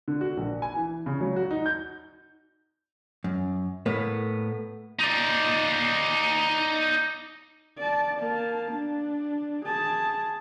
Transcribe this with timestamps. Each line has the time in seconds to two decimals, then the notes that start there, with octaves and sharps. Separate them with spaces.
0.08 D3
0.21 F#4
0.37 A#1
0.62 G#5
0.76 E3
1.06 C#3
1.20 F#3
1.36 F#4
1.51 D#4
1.66 G6
3.24 F#2
3.86 A2 A#3 B3
4.99 D#4 D5
7.78 D5 A5
8.19 A#3 A5
8.71 D4
9.65 G#4 A5